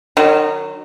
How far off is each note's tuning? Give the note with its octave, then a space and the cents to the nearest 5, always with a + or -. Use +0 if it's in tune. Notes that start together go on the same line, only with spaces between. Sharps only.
D#3 -30 F#3 +0